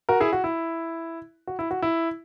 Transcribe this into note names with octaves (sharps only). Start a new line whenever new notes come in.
F#4 A#4
E4 G#4
F#4
E4
F#4
E4
F#4
E4